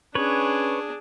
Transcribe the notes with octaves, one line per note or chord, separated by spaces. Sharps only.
C#4 D4 G#4 B4 C#5